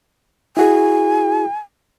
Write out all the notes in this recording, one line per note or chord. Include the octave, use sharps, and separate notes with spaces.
E4 F#4 G#4 G#5